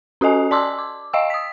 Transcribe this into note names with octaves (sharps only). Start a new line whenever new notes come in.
C#4 F#4 A4 D#5 G#5
D5 A5 C6 D6 E6
D6
D#5 F5 G5 E6
D#6 B6